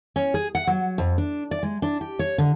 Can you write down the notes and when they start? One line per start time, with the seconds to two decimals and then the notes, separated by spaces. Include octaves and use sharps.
0.16 C#4
0.34 G#4
0.55 F#5
0.67 F#3
0.98 F2
1.18 D4
1.51 D5
1.63 G#3
1.82 D4
2.01 G4
2.19 C#5
2.38 D3